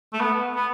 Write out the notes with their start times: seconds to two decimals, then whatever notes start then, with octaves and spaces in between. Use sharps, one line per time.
0.13 A3
0.21 B3
0.56 B3